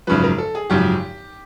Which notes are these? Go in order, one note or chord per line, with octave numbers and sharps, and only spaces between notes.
G#1 F#2 C#3 F3 B4
A#4
A4
G#4
G#1 F#2 C#3 F3 G4